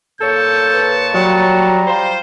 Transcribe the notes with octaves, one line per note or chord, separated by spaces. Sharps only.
A#2 A4 C#5 A5 G6
B4
F#3 G3 A#5
F4 C5